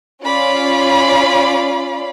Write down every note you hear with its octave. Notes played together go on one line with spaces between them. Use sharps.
C#4 F4 D5 F5 B5